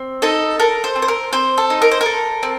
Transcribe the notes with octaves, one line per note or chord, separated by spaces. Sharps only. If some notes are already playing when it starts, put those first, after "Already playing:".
Already playing: C4
D#4 A4
A4 A#4
C5
C4
C5
A#4
C4 C5
A4
D#4
A#4
C5
A4 A#4
C4